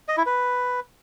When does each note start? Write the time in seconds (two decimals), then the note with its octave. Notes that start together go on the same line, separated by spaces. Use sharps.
0.08 D#5
0.17 E4
0.26 B4